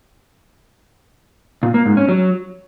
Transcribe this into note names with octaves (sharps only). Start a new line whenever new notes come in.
A#2
A#3
G#2
C#4
F#3